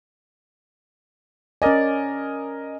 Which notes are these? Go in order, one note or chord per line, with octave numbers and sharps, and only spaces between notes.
C#4 A#4 D5 D#5 G#5